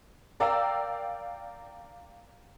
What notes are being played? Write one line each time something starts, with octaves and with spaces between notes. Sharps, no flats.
A#4 D5 F5 G5 A#5 E6